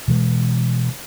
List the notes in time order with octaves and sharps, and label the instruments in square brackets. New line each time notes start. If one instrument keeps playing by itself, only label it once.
[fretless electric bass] B2 E3 G#3